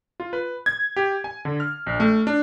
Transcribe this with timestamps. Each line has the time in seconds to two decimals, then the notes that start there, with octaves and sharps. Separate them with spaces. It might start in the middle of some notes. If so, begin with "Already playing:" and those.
0.20 F4
0.33 B4
0.66 G#6
0.96 G4
1.24 G#5
1.45 D3
1.60 F6
1.86 A#1
2.00 A3
2.27 D4